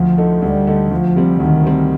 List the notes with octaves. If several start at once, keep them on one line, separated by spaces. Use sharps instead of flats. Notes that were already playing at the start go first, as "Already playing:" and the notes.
Already playing: D2 F3
D3 A3 D#4
D2 G3
D3 A3 D#4
D2 F3
C3 G3 C4
D2 D#3
C3 G3 C4